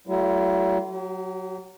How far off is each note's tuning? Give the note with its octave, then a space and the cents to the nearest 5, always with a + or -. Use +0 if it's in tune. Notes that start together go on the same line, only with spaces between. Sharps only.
F#3 +45 A3 +0 E4 +45
F#3 +0 G4 -45